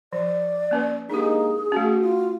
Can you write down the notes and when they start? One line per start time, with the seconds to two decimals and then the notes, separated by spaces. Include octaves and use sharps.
0.13 F3 D5
0.71 A#3 C#4 B4
1.10 G#3 A#3 D4 D#4 G4 G#4
1.72 A3 C#4 F#4
2.01 F4